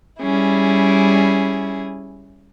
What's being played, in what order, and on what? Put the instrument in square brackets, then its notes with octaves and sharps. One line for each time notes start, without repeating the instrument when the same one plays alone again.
[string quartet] G3 C#4 E4 G#4